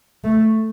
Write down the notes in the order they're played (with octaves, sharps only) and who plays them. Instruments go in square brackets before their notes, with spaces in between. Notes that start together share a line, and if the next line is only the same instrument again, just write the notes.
[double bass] A3